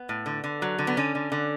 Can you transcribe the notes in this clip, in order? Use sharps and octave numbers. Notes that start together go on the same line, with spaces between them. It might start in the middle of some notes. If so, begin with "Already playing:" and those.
Already playing: B3
A2
D3
D3
F#3
D3
B3
D3 C#4
D3
D3